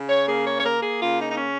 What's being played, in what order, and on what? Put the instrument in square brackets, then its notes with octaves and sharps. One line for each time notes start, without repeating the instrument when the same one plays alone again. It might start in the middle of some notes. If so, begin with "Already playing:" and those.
Already playing: [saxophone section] C#3
C#5
A#3 G#4
C#5
C#5
A#3 A#4
G#4
C#3 F4
D#4
D#4
C#3 C#4